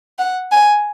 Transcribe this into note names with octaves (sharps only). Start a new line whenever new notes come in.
F#5
G#5